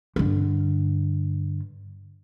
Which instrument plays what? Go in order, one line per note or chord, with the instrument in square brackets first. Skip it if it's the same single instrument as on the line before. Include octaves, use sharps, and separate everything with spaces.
[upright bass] G2 D3